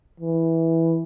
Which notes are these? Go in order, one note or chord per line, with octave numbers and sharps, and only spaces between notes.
E3